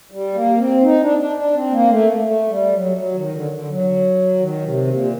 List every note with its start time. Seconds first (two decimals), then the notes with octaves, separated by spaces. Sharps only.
0.11 G3
0.34 A#3
0.58 C4
0.83 D#4
1.01 D4
1.18 D4
1.36 D4
1.54 C4
1.71 A#3
1.89 A3
2.26 A3
2.50 G3
2.73 F#3
2.97 F#3
3.15 D#3
3.33 D3
3.51 D3
3.69 F#3
4.39 D#3
4.64 C3
4.88 A#2